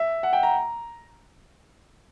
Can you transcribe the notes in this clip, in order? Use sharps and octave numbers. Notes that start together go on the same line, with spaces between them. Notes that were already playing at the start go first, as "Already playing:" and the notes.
Already playing: E5
F#5
G5
A#5